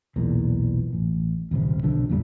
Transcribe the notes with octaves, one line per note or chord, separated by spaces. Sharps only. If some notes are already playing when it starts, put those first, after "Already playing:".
B1 E2 A#2
A1
D#1 G#1 C#2 C3
B1 D3 F3
A1 F2 A#2 G3